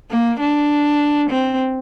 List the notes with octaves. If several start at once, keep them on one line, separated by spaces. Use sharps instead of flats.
A#3
D4
C4